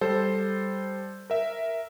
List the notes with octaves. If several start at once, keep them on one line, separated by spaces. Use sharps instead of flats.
G3 A4 C5
A#4 E5